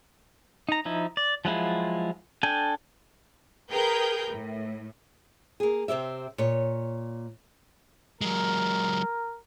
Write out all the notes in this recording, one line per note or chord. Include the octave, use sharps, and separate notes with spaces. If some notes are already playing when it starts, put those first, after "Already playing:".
D#4 A#5
F3 D#4 E4
D5
F3 F#3 G#3 E4 F4
D4 A4 G5 G#5
G#4 A#4 B4 G5 G6
A2
A#3 G#4
C3 C4 G4 E5
A#2 C#5
F#3 G#3 A#4